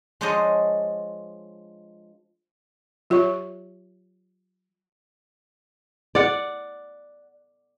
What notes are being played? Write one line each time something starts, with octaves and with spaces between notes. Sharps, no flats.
F3 G#3 D4 C5 C#5 D#5
F#3 F4 G4 C#5 C#6
D5 F#5